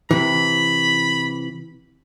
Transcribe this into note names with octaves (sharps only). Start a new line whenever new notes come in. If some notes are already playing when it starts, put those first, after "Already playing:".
C3 E3 B5